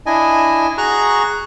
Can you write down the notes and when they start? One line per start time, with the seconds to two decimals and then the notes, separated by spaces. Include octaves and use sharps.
0.06 D4 E4 D#5 G#5
0.78 F#4 G#4 A#5 C#6 F#6